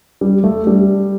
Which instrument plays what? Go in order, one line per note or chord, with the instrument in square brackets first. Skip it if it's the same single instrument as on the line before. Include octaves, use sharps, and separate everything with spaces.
[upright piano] G3
A3
G3